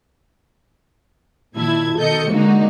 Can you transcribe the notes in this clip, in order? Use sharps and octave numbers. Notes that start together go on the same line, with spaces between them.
A#2 D#3 E4 A5 G#6
B2 D#3 A4 D#5 G6 C#7
D3 G#3 A#3 D#4 F#4